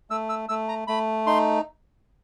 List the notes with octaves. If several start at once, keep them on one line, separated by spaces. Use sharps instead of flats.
A3 E6
E6
A3 E6
A#5
A3 B5
D#4 C6